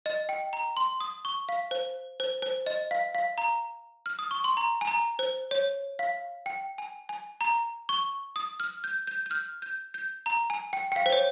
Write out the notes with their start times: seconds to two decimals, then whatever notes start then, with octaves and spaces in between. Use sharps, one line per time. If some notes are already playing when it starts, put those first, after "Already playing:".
0.06 D#5
0.29 G5
0.53 A#5
0.77 C6
1.00 D#6
1.25 C#6
1.49 F5
1.71 C5
2.20 C5
2.42 C5
2.66 D#5
2.91 F5
3.15 F5
3.38 A#5
4.06 F6
4.19 D#6
4.31 C#6
4.44 C6
4.57 A#5
4.81 G#5
4.87 A#5
5.19 C5
5.51 C#5
5.99 F5
6.46 G5
6.78 G#5
7.09 G#5
7.41 A#5
7.89 C#6
8.36 D#6
8.60 F6
8.84 G6
9.07 G6
9.26 G6
9.31 F6
9.62 G6
9.94 G6
10.26 A#5
10.50 G#5
10.73 G5
10.92 G5
10.96 F5
11.06 C5
11.12 C#5